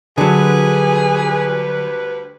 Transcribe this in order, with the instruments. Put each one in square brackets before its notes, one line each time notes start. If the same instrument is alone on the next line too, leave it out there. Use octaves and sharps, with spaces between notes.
[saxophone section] D2 G3 B4 [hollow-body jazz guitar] D3 F#3 [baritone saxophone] G#4